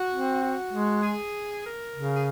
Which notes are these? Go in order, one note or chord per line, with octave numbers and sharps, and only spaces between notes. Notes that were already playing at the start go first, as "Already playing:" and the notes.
Already playing: F#4
C4
F#4
G#3
G#4
A#4
C#3
G#4